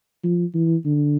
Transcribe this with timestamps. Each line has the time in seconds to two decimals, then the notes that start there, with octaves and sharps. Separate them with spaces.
0.24 F3
0.55 E3
0.85 D3